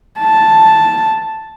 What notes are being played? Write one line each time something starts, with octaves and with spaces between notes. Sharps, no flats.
A5